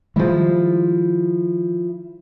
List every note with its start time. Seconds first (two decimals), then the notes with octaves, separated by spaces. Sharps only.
0.16 D#3 F3 G3 G#3 E4